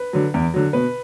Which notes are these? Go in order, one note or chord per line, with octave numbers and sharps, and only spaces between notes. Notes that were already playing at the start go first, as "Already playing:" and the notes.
Already playing: B4
D3 F#3
E2
D3 F#3
B2 B4